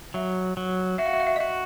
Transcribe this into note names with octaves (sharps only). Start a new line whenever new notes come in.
F#3 E5
F#3
F#4 E5
F5
E5
F5
E5
D#5
F#4 E5